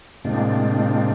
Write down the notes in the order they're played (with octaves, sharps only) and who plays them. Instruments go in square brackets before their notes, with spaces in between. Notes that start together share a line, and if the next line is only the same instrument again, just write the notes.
[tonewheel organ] A2 C3 G#3 A#3 C4 D4